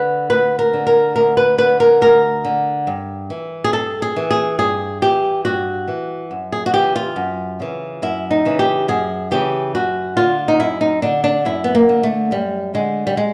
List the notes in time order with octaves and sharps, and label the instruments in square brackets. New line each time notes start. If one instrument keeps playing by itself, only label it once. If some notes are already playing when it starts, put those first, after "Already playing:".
Already playing: [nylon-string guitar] D3 B4
D2 B4
A#4
D3
A#4
D2 A#4
B4
D3 B4
A#4
D2 A#4
D3
G2
E3
G#4
G2 A4
G#4
E3
G#4
G2 G#4
E3 G4
G2 F#4
E3
F#2
G#4
F#4
C#3 E3 G4
F4
F#2
C#3 E3
F#2 E4
D#4
C#3 E3
G4
F#2 G#4
C#3 E3 G4
F#2 F#4
D3 F4
D#4
F#2 E4
D#4
D3 D4
D4
F#2 E4
B3
A#3
D3
A3
F#2 G3
D3 G#3
G3
G#3